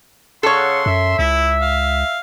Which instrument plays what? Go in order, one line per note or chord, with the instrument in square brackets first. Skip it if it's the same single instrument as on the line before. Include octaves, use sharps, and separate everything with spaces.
[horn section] C#3 F#5 [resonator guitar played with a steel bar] A4 C#5 [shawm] C6
[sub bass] F#2 [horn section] E5
[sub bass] C#2 [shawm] E4
[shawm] F5